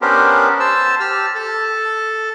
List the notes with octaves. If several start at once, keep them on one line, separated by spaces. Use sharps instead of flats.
B3 C#4 D4 G4 A#4 C5
C5 A5 E6
G4 A5 E6 F6
A4 A5